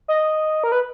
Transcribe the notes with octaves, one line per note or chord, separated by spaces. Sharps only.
D#5
A#4
B4